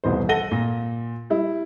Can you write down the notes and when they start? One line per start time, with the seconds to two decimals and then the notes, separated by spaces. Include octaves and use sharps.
0.04 D#1 C2 B2 E3 C5
0.29 A4 F#5 A5 A#6 D#7 G7
0.51 A#2
1.30 G3 E4